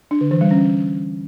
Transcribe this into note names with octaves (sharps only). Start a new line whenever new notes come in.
D4
D3
E3
G3
C#4